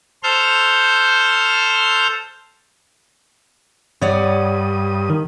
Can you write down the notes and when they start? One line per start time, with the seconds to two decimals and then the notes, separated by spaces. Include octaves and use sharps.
0.23 A4 C5 F6 G6
4.02 G2 C#5 D5 F#5 D#6
5.10 D#3